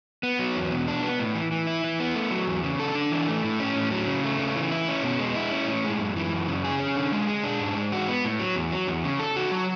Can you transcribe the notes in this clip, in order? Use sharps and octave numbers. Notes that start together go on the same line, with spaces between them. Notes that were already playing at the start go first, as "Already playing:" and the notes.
B3
F#3
E2
B2
D4
B3
A2
E3
E3
E4
E3
B3
A3
F#3
E2
C#3
A4
D4
E3
A3
A2
C#4
A2
F#3
C#3
A3
C#3
E3
E4
C#4
B2
G#3
E4
C#4
A2
G#3
F#2
E3
F#2
C#3
G#4
C#4
D3
G#3
G#4
D4
G#2
G#3
F#4
B3
A2
F#3
E2
F#3
E2
C#3
A4
F#4
F#3